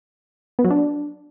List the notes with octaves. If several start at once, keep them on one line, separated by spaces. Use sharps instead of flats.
B3
F#3
D4